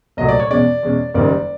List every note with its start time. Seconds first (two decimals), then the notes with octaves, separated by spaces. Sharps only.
0.17 C2 A#2 F#3 A3 D#5
0.29 D5
0.40 C#5
0.49 E2 B2 G#3 C#4 D5
0.83 E2 B2 G#3 C#4
1.14 F#1 F#2 D#3 G3 D5